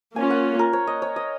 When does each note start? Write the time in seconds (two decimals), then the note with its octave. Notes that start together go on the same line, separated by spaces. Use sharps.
0.16 A#3 C#4 F4 G#5
0.30 F#5
0.59 A#4
0.73 C#5
0.87 D#5
1.02 C#5
1.16 D#5